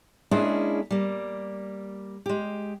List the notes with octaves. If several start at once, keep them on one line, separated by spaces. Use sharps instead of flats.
G#3 A#3 C#4 D4 E4 G#4
G3 A#3
G#3 G4